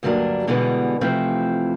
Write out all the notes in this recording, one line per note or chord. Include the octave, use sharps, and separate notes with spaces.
D2 G2 F#3 G3 A#3 D4
B2 D3 E3 G3 G#3 B3
C3 E3 F3 A3 C4